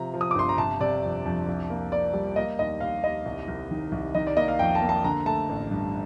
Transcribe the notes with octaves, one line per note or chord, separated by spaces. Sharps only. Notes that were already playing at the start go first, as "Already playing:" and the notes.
Already playing: C3 F3 A#5
F3
D#6
D6
G1 C6
A#5
C3 A5
C3 D5
F2
F2
C2
A#3
A#3 D5
G3
A#3 D#5
D#2 D#5
D#2 F5
D#2 D#5
C2
C2
D#3
C2
D#3 D#5
D5
A#3 D#5
F5
F2 G5
A5
A#3
A5
D3 A#5
A3 A5
A1
G2